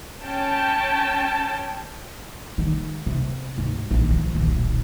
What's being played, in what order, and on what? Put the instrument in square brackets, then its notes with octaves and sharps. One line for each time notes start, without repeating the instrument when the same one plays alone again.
[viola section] C#4 G5 A5
[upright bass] D#3 G#3
C3
D2 G#2
A#1 D#2
F3
D#1 B1